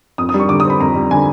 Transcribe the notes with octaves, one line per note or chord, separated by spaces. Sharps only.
F2 D#6
D#6
G3
C#6
D3 D6
C4 D#6
B5
F2 A#5
G3
D3 G#5